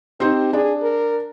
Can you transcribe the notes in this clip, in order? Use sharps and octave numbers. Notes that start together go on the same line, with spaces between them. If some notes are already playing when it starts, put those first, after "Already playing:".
C4 D#4 G4 C5
D4 G#4
A#4